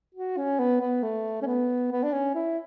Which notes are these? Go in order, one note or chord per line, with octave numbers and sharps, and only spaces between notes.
F#4
C#4
B3
B3
A3
C#4
B3
B3
D4
C#4
E4